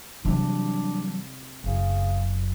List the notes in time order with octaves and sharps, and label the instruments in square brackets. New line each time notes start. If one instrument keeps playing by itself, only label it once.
[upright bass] C3 [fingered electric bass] E3 F#3 G3 [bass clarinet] D4
[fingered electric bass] F#1 F#2 [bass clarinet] C#3